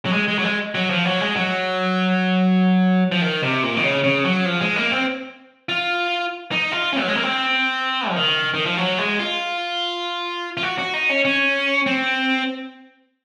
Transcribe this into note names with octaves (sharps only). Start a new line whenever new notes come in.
F#3
G#3
G#3
F#3
G#3
F#3
F3
F#3
G#3
F#3
F3
D#3
C3
A#2
D#3
C#3
C#3
F#3
F3
G#3
A#3
C4
F4
D#4
F4
C#4
F#3
G#3
A#3
C4
F3
D#3
D#3
F3
F#3
G#3
F4
F4
F#4
F#4
D#4
C#4
C#4
C4